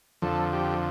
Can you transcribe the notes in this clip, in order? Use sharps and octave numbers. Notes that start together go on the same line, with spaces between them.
F2 D3 F3 A4
G4